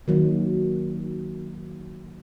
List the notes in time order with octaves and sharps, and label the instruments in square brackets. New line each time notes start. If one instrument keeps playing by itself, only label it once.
[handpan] D#3 F#3 A#3